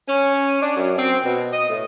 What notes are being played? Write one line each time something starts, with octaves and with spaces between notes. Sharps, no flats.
C#4
D4
F#2
C4
B2
D#5
A2